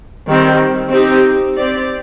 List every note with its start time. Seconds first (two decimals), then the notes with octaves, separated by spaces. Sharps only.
0.27 D#3 G3 C4
0.91 C4 D#4 G4
1.56 C4 G4 D5